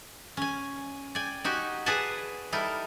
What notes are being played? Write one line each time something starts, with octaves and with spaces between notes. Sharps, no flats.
C#4 G#5
D5 G5 G#5
D#4 F#4 G4 G#5
G#4 B4 D5 F#5 G#5 A5
G3 D#4 E4 A4 A#4